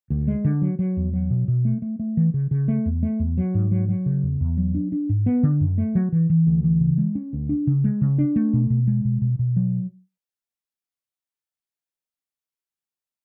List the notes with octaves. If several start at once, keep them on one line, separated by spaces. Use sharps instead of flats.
D2
G#3
D3
F#3
F#3
E2
F#3
B2
B2
A3
A3
A3
E3
C#3
C#3
A3
E2
A3
E2
F#3
G#2
F#3
F#3
C#3
E2
E2
F#3
D4
D4
G#2
B3
D3
F#2
A3
F#3
E3
E3
D2
E3
C#3
G#3
C#4
D2
D4
C#3
G#3
C#3
D4
A3
B2
B2
G#3
B2
B2
B2
F#3